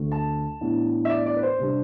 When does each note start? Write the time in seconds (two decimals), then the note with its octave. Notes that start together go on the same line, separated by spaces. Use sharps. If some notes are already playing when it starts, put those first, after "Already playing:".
Already playing: D2 D3 A3
0.12 A5
0.61 A2 E3 B3 D4
1.05 E5
1.10 D5
1.26 D5
1.37 B4
1.43 C5
1.59 C3 G3 D4